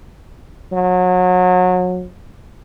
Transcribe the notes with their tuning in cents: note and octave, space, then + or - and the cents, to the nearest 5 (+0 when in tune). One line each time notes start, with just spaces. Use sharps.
F#3 -30